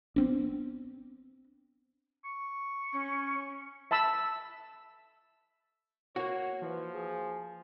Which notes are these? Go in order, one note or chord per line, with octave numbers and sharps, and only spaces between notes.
B3 C4 D4
C#6
C#4
E5 A5 B5 E6
A#3 F#4 C#5 F#5
E3 F3
G#4